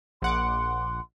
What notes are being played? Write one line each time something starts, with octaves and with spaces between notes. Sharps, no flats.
A#1 F#5 C6 D6